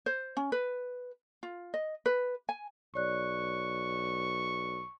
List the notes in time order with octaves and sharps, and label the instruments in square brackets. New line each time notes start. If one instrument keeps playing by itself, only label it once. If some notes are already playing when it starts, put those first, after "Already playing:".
[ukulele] C5
C#4
B4
F4
D#5
B4
G#5
[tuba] B1 [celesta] C#5 D5 F#6 [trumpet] C#6